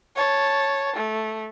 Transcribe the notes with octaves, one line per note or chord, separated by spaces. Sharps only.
C#5 A5
A3